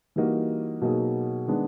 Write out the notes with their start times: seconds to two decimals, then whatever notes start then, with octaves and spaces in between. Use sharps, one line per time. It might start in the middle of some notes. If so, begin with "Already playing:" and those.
0.16 E3 G3 A#3 D#4 F#4
0.81 B2 F#3 A#3 D#4 G#4
1.47 D#3 G#3 B3 D4